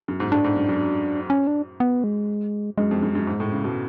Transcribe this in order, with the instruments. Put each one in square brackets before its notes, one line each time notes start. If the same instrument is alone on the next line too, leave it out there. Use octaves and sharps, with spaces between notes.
[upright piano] F#2
G#2
[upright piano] A2 [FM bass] D4
[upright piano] G#2
F#2
F#2
[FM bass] C#4
D4
B3
G#3
[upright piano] F#2 [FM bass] G#3
[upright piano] F2
F#2
F#2
G#2
A2
C#3
B2